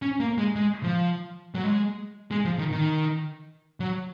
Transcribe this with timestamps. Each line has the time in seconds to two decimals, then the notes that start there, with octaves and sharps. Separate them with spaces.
0.02 C#4
0.20 A#3
0.38 G#3
0.56 G#3
0.83 F3
1.55 F#3
1.64 G#3
2.31 G#3
2.45 F3
2.58 D#3
2.72 D#3
3.80 F#3